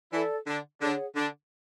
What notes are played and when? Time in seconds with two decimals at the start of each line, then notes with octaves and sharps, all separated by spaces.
0.12 E3 E4 A4 D5 A5
0.47 D3 D4
0.81 D3 D4 G#4 C#5 F#5
1.16 D3 D4